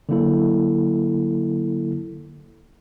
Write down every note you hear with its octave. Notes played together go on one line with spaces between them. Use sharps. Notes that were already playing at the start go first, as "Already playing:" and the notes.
D3 F#3 A#3 E4 A4